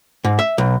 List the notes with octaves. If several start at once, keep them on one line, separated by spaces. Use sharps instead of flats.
G#2
E5
B1